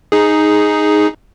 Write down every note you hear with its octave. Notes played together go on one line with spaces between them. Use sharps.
D#4 G#4